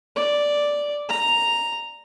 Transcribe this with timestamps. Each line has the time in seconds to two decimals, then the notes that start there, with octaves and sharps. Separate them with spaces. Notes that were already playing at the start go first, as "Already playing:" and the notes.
0.16 D5
1.09 A#5